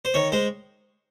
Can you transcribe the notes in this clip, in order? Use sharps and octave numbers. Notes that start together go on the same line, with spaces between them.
C5
D#3 C#5
G#3 C5